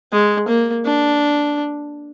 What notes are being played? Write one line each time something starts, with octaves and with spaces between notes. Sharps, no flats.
G#3
A#3
D4